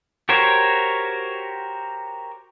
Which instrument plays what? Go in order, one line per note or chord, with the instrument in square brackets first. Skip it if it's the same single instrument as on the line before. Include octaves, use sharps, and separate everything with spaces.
[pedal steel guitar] F#4 G4 A#4 C5 C#5